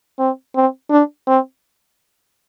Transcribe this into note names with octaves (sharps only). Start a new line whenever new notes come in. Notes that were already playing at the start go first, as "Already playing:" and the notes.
C4
C4
D4
C4